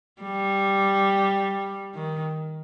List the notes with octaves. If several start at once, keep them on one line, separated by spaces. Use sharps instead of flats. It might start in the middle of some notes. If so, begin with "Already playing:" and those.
G3
D#3